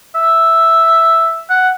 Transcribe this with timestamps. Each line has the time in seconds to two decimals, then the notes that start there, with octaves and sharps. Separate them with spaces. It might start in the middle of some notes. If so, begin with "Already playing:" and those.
0.15 E5
1.50 F#5